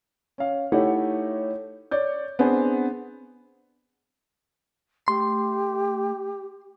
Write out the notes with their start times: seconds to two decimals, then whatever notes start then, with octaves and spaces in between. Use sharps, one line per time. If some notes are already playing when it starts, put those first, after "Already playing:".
0.38 C#4 F5
0.72 A3 D#4 E4 G4 C#5 F#5
1.91 C#5 D5 G6
2.39 B3 C4 D4 G#4 C5
5.08 A3 G4 C6